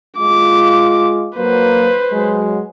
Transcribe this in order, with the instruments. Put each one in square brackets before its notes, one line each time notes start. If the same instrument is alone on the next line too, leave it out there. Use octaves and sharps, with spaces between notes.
[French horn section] G#3 F4 [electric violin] D6
[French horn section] F#3 A#3 [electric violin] B4 C5
[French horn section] F#3 G#3